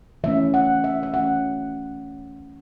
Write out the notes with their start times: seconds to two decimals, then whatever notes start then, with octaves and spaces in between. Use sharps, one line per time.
0.24 E3 A3 C#4 E5
0.54 F#5
0.84 E5
1.03 E5
1.14 E3 A3 C#4 F#5